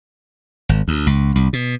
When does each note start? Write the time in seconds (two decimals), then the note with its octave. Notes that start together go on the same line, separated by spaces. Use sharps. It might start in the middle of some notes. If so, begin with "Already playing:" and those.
0.69 G#1
0.88 D2
1.07 C#2
1.36 C2
1.53 B2